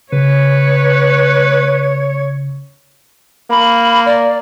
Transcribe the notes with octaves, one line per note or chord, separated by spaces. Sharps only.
C#3 B4 C#5
A#3 B5
D5